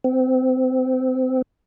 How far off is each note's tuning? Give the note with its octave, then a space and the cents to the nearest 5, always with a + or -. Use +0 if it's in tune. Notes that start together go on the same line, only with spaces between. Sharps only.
C4 -25